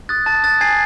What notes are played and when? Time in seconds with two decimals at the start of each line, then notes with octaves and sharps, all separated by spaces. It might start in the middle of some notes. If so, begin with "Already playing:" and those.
0.09 D#6 F#6 A6
0.26 A5 A6
0.43 D#6 F#6 A6
0.60 G#5 G#6 C7